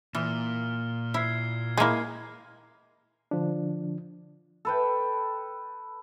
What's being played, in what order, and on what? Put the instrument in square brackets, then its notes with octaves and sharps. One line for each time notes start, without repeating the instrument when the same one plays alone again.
[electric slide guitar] A#2 [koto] E3 [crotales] F6
[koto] E4 [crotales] G#6 C7
[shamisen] G#3 E4 [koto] A#3 G#4
[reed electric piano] D3 F3 D4
[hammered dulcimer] A4 B4 G5